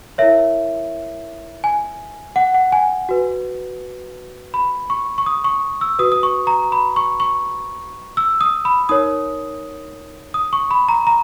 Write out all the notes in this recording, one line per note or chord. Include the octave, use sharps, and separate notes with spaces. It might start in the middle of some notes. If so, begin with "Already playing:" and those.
E4 A#4 C#5 E5
G#5
F#5
F#5
G#5
F#4 B4
B5
C#6
C#6
D#6
C#6
E6
F#4 B4 D#6
D#6
C#6
A#5
B5
C#6
C#6
E6
D#6
B5
D#4 A#4 C#5 D#6
D#6
C#6
B5
A#5
A#5